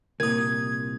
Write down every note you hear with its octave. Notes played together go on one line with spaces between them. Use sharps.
C2 A#2 A#4 D#6 G#6